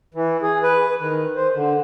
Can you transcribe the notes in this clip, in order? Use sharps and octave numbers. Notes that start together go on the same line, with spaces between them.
E3
G#4
B4
D#3
C5
D3